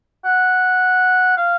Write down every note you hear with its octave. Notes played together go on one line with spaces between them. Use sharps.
F#5
F5